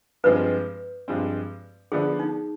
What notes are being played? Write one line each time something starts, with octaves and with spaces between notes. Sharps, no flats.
G2 F3 G#3 C4 B4
G2 F3 G#3 C4
D3 F3 B3 D4 G#4
D#4